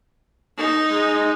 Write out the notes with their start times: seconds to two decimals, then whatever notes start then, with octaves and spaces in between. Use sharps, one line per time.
0.58 D#4
0.88 G#3